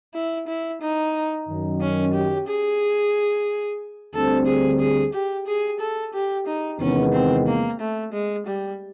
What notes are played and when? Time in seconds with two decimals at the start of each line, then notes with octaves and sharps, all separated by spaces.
0.14 E4
0.47 E4
0.81 D#4
1.48 F#2 D#3 F#3
1.81 C#4
2.14 G4
2.47 G#4
4.13 D2 D3 G3 C4 A4
4.47 G#4
4.79 G#4
5.13 G4
5.46 G#4
5.80 A4
6.14 G4
6.46 D#4
6.79 E2 C3 D#3 G#3 B3 C#4
7.12 C4
7.46 A#3
7.80 A3
8.13 G#3
8.46 G3